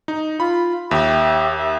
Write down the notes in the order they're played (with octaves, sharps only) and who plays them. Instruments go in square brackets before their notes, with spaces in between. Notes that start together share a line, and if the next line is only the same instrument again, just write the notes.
[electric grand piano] D#4
[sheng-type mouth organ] F4 [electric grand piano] B5
[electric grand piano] D#2 [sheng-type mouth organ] G4 E5
[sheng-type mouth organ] E5